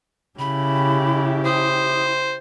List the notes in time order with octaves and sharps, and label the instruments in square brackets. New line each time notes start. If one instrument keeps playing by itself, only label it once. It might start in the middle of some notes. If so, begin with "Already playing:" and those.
[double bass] C#3 [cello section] E4 G4 [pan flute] B5
[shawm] C5 [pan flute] D#6